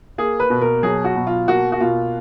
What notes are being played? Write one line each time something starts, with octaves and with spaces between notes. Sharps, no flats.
A#3 G#4
B4
B2
A#4
F#3 G#4
F#4
B2
F4
A#3 F#4
F#4
B2 F4